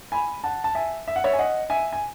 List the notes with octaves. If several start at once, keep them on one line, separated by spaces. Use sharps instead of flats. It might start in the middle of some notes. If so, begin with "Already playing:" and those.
G#5 B5
F#5 A5
A5
E5 G#5
E5
F#5
C#5 E5
G#5
D#5 F#5
E5 G#5
G#5